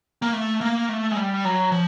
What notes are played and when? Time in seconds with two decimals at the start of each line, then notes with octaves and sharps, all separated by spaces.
0.22 A#3
0.33 A3
0.61 A#3
0.89 A3
1.11 G#3
1.16 G3
1.45 F#3
1.72 F3